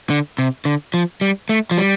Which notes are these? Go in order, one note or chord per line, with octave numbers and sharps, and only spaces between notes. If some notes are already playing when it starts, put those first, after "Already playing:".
D3
C3
D3
F3
G3
A3
F3
G3